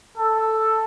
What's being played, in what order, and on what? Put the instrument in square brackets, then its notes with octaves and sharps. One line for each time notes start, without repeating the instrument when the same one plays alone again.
[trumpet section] A4